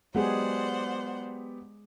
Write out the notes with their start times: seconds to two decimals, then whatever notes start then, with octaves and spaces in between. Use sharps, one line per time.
0.15 F#3 G#3 B3 G4 G#4 C5 D5 F#5